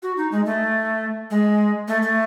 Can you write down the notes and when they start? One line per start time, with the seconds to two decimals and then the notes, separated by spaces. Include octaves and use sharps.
0.03 F#4
0.17 D#4
0.32 G#3
0.46 A3
1.31 G#3
1.88 A3
2.02 A3